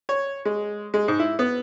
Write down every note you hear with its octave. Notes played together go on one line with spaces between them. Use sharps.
C#5
G#3
G#3
G#2
E4
B3